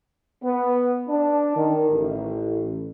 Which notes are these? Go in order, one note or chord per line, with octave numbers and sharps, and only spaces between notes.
B3
D4
D#3
A1